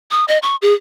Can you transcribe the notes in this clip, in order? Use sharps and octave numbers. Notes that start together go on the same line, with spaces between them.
D#6
D#5
C#6
G#4